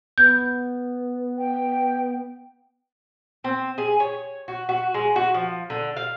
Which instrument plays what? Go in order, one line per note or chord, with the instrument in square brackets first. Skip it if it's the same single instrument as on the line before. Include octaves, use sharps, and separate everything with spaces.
[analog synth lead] B3 [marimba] G6
[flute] G5
[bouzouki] C4
G#4
C#5
F#4
F#4
G#3
F#4
F3
D3
F5